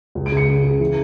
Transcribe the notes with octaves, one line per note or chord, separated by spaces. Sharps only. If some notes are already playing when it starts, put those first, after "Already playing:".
C#2
D7
C#3
C#7
C#3
C#3
E3